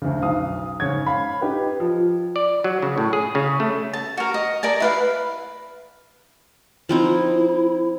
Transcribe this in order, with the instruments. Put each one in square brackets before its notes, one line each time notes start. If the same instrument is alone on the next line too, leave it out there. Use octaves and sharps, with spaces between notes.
[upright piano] D2 C#3
B1 F5 D#6
G#2 C#3 C#5 G#6
F5 B5
D#4 G4 B4
F3
[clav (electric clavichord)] D5
F#3
C#3
A2
G#4
C#3
A3
[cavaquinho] A5
F#4 A#4
D#5
A#4 D5 G#5 A5
E4 B4 F5
[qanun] F3 C4 D#4 [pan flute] E4